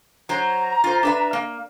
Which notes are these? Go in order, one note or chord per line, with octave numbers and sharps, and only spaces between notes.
F#3 C5 A#5
F4 C5
D4 B4 E5
A#3